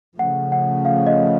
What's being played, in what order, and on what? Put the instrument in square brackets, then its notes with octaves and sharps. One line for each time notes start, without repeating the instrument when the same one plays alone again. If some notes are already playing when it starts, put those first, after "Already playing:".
[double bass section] C#3 F3 A3 [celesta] F#5
[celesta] F#5
F5
D#5